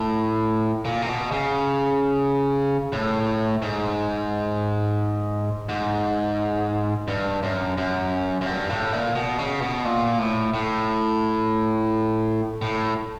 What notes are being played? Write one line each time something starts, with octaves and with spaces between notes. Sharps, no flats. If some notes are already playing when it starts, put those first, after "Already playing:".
Already playing: A2
A#2
C3
B2
C#3
A2
G#2
G#2
G2
F#2
F#2
F#2
G2
A2
A#2
B2
C#3
B2
A#2
A2
A2
A2